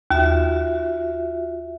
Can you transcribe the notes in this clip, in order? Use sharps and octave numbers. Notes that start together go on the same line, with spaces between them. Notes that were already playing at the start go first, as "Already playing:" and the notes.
D#2 F4 F#4 E5